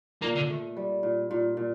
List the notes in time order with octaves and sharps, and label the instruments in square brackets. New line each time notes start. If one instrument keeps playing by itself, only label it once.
[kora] A#2 [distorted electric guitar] A#3
[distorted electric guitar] D3
[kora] A3
G3
A#2
A#2
A#2